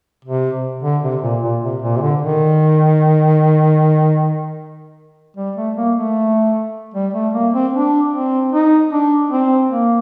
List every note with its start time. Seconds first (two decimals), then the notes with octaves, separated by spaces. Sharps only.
0.25 C3
0.83 D3
1.03 C3
1.22 A#2
1.43 A#2
1.63 C3
1.82 A#2
1.97 C3
2.01 D3
2.22 D#3
5.37 G3
5.56 A3
5.76 A#3
5.96 A3
6.94 G3
7.14 A3
7.33 A#3
7.54 C4
7.73 D4
8.12 C4
8.52 D#4
8.91 D4
9.30 C4
9.70 A#3